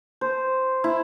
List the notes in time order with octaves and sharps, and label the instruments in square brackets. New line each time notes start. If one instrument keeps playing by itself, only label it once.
[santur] C5
E4